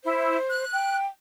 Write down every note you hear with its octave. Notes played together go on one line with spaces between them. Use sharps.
E4 C5
F#6
G5